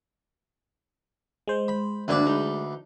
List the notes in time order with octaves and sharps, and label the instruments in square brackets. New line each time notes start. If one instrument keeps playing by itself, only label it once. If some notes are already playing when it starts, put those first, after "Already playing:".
[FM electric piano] G#3 C5
[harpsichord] B5
[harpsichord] D2 B4 D5 [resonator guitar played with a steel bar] G2 A#3 D4
[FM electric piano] G#3 [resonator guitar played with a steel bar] D#4